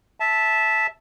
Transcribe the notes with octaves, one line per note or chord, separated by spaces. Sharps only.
E5 A5